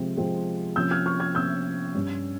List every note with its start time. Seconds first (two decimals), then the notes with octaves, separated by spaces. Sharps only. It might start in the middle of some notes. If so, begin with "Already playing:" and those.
Already playing: C3 F3 G#3 C4
0.17 C3 F3 G#3 C4
0.76 C3 F3 A#3 C#4 E6 G6
0.91 F6 G#6
1.06 C#6 F6
1.20 F6 G#6
1.35 C3 F3 A#3 C#4 E6 G6
1.94 G2 G3 C#4